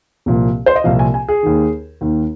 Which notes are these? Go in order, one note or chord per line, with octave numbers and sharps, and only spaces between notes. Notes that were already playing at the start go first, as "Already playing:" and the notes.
C2 A#2 F3
C5
D#5
C2 A#2 F3 F5
G#5
G#5
G#4
D#2 D#3
D#2 D#3